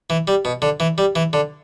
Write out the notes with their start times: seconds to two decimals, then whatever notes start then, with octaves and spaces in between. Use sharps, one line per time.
0.10 E3
0.27 G3
0.45 B2
0.62 D3
0.80 E3
0.98 G3
1.15 E3
1.33 D3